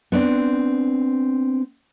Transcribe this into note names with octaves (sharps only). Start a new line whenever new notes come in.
B3 C4 D4